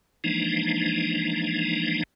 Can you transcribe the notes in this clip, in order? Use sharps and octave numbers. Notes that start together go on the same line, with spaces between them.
E3 F3 G#3 A#3 D4 D#4